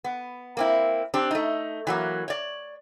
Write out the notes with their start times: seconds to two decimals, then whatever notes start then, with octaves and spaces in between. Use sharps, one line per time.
0.04 B3
0.57 A#3 C4 E4
1.14 C4 D4 G4
1.31 A3 D#4
1.87 E3 F#3 A#3
2.28 C#5 D5